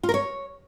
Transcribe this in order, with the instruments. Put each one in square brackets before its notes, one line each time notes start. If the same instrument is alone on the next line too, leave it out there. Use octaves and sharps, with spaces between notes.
[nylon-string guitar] F4
A#4
C#5